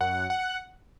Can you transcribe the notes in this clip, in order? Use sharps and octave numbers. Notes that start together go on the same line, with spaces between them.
F#2 F#5
F#5